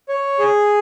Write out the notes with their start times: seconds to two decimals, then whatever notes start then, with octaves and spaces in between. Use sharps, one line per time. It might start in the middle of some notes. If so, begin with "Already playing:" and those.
0.09 C#5
0.39 G#4